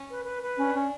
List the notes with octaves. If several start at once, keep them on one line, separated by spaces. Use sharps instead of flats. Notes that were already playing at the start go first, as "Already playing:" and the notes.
Already playing: C#4
B4
B4
B4
C#4 D4
C#4